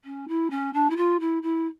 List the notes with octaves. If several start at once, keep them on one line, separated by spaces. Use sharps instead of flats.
C#4
E4
C#4
D4
E4
F4
E4
E4